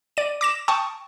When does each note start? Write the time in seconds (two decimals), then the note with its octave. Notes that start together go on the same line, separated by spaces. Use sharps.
0.17 D5 D#7
0.41 D6 A#6 E7
0.68 G5 A5 C#6 D#6